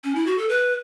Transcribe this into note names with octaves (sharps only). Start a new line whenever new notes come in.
C#4
E4
F#4
A4
B4